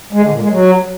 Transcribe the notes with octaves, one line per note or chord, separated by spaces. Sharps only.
G#3
D3
A#2
G#3
F#3